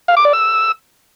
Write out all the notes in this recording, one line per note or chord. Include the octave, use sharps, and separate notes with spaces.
F5
D6
D5
E6